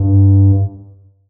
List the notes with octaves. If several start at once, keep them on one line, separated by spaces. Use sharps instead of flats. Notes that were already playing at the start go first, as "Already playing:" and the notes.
Already playing: G2